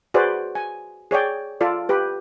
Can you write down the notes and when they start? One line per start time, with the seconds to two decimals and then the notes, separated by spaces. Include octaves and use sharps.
0.14 F#4 G#4 B4 C5 D5
0.55 G#5
1.11 G#4 C#5 D5 G5
1.61 F4 A4 D5
1.89 G4 B4